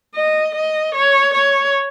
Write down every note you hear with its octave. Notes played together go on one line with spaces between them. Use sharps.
D#5
D#5
C#5
C#5